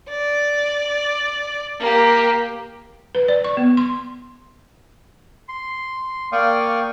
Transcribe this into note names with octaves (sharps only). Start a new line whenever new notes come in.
D5
A#3 G4
B4
D5
C#6
B3
C6
C6
A#3 D5 F5 G5 C#6 D#6